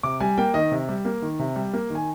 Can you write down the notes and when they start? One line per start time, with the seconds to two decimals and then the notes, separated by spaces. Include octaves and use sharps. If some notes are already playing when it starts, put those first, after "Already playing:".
0.03 C3 D6
0.20 G3 G#5
0.38 A#3 G5
0.54 D#3 D#5
0.72 C3
0.89 G3
1.05 A#3
1.22 D#3
1.39 C3
1.56 G3
1.73 A#3
1.90 D#3
1.95 G#5